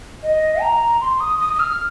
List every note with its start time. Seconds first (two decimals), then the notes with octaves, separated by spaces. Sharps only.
0.23 D#5
0.61 A#5
1.01 C6
1.20 D#6
1.40 D#6
1.53 D#6
1.59 F6